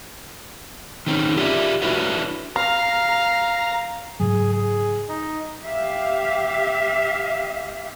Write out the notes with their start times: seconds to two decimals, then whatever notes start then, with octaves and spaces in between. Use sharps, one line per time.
1.07 D#3 C4 C#4 D#4
1.36 F4 G4 C5 D5 E5
1.82 D4 E4 F#4 B4 C#5 E5
2.56 F5 A#5
4.20 G#2 C#3 F#3 G#4
4.53 G#4
5.09 D#4
5.62 G4 E5 F5